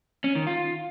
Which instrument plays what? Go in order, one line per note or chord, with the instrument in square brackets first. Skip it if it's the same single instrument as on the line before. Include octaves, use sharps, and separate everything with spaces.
[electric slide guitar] C#4
D#3
F4